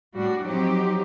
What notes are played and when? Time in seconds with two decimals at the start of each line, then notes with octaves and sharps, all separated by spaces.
0.14 A2 G3 D4 F#4
0.43 F3 F#3 C4 D#4 G4